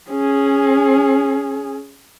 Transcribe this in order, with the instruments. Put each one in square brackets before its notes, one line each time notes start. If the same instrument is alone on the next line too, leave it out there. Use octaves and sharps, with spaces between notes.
[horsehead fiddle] C#4 G#4